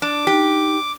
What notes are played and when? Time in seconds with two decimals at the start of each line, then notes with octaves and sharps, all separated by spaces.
0.02 D4 D6
0.27 D#4 G4